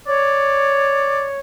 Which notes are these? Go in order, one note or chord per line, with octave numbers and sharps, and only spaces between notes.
C#5 D5